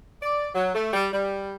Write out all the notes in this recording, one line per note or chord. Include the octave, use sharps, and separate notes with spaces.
D5
F#3
A3
G3
G3